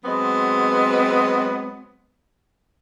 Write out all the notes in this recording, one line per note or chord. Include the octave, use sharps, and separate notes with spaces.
F#3 G#3 B3 C4